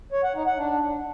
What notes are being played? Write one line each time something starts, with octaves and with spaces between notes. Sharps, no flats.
C#5
F#5
D#4
F#5
D4